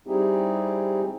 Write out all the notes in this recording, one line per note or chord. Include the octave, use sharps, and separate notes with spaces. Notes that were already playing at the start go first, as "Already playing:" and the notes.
G3 C4 D#4 E4 G4 G#4